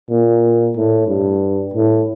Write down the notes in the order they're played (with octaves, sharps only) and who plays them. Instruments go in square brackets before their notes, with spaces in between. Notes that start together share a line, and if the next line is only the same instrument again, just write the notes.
[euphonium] A#2
A2
G2
A2